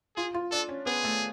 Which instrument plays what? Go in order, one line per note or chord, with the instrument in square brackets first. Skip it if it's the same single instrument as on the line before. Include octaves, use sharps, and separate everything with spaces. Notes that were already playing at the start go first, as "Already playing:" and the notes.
[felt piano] F4 [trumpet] G#4
[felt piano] F4
[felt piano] D4 [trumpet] A4
[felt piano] C#4
[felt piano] B3 [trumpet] G#4
[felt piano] A3